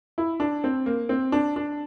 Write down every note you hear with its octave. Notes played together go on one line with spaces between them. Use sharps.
E4
D4
C4
A#3
C4
D4
D4